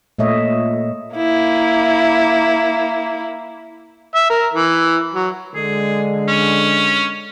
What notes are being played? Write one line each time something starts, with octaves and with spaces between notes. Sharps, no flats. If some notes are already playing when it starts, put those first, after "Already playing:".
A#2 A3 C#5 D#5 E5
A#3 E4
E5
A#4
E3
F#3
D3 G#3 G#4
C#4